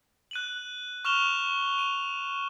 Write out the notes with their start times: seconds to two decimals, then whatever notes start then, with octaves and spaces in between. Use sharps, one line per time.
0.31 F#6 D#7 F#7
1.05 C#6 F6 E7 F7 G7
1.78 D#7